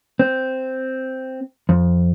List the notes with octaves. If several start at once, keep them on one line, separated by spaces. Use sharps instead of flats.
C4
F2